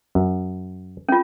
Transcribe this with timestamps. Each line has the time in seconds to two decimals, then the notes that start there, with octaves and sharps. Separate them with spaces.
0.15 F#2
1.09 C#4 F4